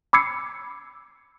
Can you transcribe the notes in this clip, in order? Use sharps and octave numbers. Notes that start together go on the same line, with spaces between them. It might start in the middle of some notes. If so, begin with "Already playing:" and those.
B5 D6 E6 G#6 C7 C#7